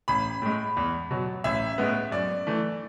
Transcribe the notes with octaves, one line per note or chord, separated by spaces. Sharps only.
A1 B5
A2 G#3
E2
B2 F#3
A1 E5
A2 G#3 B3
F#2 D5
E3 A3